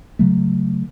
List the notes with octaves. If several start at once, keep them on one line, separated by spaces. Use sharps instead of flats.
C#3 F#3 A3